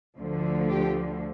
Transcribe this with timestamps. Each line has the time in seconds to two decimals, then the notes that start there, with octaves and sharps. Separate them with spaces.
0.18 D2 D3 F3
0.69 G4